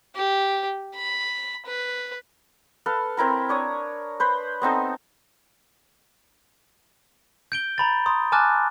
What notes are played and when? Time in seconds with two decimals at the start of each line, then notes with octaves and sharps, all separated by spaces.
0.15 G4
0.95 B5
1.66 B4
2.86 A4 B4 F5
3.17 C4 E4 A#4 B5
3.49 D4 C#5 D#6
4.20 B4 C5 B5
4.62 B3 C4 D#4 A4
7.52 G6 D7 G7
7.78 A#5 B5 A6
8.06 A#5 C6 D#6
8.32 G#5 A5 D6 F6 F#6 A6